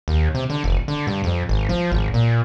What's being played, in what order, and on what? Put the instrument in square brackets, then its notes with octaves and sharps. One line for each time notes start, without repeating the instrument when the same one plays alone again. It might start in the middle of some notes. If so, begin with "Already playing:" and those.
[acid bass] D#2
C3
D3
F1
D3
G2
F2
G#1
F3
G#1
A#2